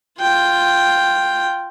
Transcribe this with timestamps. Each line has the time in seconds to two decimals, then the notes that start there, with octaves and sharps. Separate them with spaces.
0.19 F4 G5